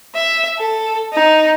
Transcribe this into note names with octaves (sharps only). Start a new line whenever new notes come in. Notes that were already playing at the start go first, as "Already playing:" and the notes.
E5
A4
D#4